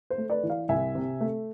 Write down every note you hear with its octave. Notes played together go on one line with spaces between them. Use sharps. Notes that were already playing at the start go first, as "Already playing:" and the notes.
C5
A3
B4 D5
E3
D5 F5
C2 E5 G#5
C3
A3